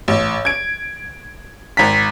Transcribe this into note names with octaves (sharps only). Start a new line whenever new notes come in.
A1
G#6 D7
G#1 A#5 B6